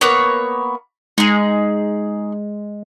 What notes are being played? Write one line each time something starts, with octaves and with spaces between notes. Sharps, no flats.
A#3 B3 C#5
G#3 D#4 G#4